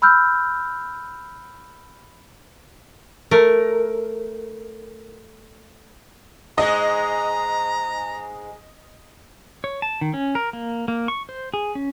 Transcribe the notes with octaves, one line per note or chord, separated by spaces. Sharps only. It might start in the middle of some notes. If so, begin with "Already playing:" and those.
B5 E6 F6 G6
A3 A#4
G#2 G#3 D#5 A#5
C#5
A5
D#3
C#4
A#4
A#3
A#3
C#6
C5
G#4
C#4